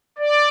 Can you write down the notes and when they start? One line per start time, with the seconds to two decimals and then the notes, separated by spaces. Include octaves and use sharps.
0.18 D5